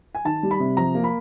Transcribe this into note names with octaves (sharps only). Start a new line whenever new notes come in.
G#5
D#3 A5
G3
B5
C3
F3 A#5
A#3
B5